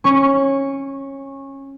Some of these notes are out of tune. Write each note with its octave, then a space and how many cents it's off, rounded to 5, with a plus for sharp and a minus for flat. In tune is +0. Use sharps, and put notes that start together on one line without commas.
C#4 -20 C#6 +5